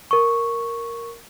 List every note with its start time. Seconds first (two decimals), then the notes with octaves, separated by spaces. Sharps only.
0.11 A#4 C#6